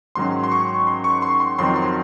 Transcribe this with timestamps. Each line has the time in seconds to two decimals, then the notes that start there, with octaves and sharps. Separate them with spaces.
0.15 G#2 D#3 F#3 C#4 C6
0.44 C6
0.52 C#6
0.87 C6
1.04 C#6
1.22 C6
1.40 C6
1.59 F2 D#3 F#3 C4 C6
1.76 C6